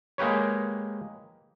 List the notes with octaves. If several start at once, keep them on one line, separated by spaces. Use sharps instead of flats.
G#3 A#3 G4 B4 C#5